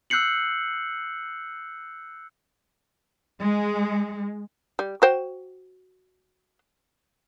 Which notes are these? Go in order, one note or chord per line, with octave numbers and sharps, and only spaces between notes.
E6 F#6 G6 C7 C#7 F#7
G#3
G3
F#4 C5 G5